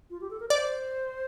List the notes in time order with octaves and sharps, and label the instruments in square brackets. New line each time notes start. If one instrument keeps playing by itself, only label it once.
[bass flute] F4
G4
A4
A#4
[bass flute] C5 [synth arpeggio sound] D5